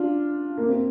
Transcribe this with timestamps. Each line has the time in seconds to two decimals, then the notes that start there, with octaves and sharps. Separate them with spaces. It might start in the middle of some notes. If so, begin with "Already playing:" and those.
Already playing: D4 F4
0.58 A#3
0.68 C4